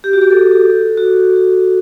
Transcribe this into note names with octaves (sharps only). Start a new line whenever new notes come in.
G4
F#4
G4
A4
F#4